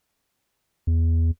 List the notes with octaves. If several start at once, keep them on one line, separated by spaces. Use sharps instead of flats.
E2